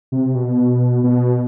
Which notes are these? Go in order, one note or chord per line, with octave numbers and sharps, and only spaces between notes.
C3
B2
B2